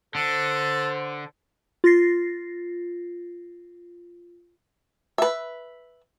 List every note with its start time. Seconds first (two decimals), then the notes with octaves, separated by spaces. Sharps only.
0.15 D3 A4 C5
1.84 F4 A6 A#6 C7
5.18 B4 E5